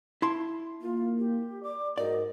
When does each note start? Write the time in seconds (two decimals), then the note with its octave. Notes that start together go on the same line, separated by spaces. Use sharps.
0.22 E4 A5 C6
0.82 A#3 F4
1.18 G4
1.63 D5 D6
1.98 G#2 F#4 A#4 D5 D#5